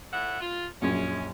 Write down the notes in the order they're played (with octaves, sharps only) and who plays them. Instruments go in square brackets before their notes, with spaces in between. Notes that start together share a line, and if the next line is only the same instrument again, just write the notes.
[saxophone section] A2 E5 F#5
F4
[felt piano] A#1 F#2 [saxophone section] G#3 C#4